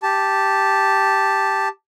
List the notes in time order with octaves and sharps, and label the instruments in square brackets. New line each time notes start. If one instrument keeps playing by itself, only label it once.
[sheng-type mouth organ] G4 A5